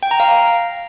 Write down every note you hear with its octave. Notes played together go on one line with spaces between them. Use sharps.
G5
A#5
F5